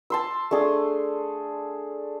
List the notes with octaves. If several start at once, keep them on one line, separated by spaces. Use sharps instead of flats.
A5 C6 E6
A3 D4 G#4 A4